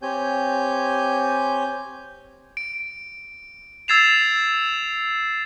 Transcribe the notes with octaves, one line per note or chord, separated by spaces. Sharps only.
C4 G4 C#5 G#5 G6
D7
E6 G#6 A6 C7 E7 F7